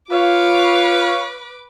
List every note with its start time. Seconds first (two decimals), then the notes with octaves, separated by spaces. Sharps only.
0.11 F4 B4 C#5 F5 D6